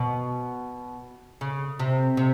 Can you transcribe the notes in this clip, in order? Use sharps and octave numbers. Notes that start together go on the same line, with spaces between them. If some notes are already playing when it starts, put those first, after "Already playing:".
Already playing: B2
C#3
C3
C3